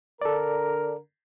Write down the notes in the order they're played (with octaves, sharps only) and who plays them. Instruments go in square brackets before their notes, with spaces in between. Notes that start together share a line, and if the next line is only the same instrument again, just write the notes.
[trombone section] D3 A#4 [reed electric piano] A4 D5